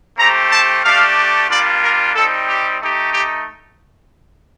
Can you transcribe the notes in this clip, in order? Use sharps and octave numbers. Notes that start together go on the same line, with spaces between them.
A3 C4 G4 A#5
A5
A3 D4 G4 F5
G3 A#3 D4 F4 D5
A#4
G3 C4 D#4 A4
G4
A3 D#4 G4
G4